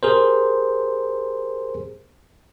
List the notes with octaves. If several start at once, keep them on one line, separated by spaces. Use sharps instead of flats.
G4 G#4 A#4 C5